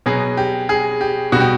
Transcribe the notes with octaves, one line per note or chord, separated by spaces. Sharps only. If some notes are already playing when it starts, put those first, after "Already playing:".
B2 F#3 G#4
G4
G#4
G4
B2 G3 F#4 G4